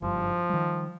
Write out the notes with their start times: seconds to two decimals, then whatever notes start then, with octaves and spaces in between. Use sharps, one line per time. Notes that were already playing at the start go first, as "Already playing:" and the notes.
0.02 F#1 G2 F3
0.49 D#3 G3